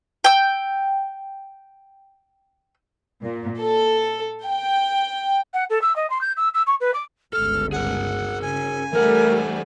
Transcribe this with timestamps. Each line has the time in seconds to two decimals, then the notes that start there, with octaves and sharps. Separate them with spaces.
0.24 G5 E6
3.23 A#2
3.61 A4
4.45 G5
5.54 F#5
5.70 A4
5.82 E6
5.96 D#5
6.10 C6
6.21 G6
6.37 E6
6.54 E6
6.67 C#6
6.81 B4
6.94 D6
7.33 G1 C#2 A4 F6
7.72 G#4 A#4 F#5
8.42 C#3 G#5
8.93 E3 G3 A3 A#4 C5 F#5